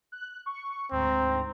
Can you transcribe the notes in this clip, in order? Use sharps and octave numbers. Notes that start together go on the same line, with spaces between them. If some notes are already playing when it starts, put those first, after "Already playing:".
F#6
C#6
D2 G#2 C4 A#5